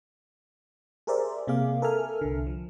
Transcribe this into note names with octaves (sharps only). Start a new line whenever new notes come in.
G4 G#4 A#4 C5 D5 E5
C3 A#3 G#4 F5 D6
A4 A#4 E5 G#5 F6
C2 D3
F3